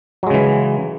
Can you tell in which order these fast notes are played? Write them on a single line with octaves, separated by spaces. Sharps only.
F#3 G#3 C#3 E3